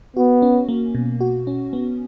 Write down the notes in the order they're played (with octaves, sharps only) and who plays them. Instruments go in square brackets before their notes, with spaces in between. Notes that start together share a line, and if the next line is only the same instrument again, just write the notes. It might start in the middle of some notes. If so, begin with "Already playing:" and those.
[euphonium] B3 [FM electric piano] F#4
[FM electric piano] C#4
A#3
B2
F#4
C#4
B3